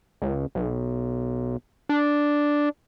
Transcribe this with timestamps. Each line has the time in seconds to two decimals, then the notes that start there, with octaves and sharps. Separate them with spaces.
0.22 C#2
0.55 B1
1.89 D4